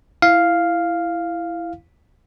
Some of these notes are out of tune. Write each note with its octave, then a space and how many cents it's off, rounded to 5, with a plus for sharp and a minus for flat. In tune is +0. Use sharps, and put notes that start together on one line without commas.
E4 +10 F5 +0